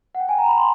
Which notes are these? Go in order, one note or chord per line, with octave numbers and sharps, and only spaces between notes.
F#5
G5
G#5
A#5
B5
C6